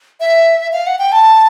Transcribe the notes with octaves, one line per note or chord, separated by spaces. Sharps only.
E5
F5
F#5
G5
A5